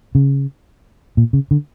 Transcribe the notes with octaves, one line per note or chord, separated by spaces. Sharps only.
C#3
A#2
C#3
D3